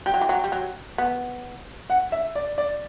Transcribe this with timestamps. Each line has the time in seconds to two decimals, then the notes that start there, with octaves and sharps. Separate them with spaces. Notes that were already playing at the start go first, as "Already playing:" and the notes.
0.06 G3 G5
0.14 F#3
0.21 E3
0.29 F#3
0.44 G3
0.52 F#3
0.98 B3
1.90 F#5
2.12 E5
2.35 D5
2.58 D5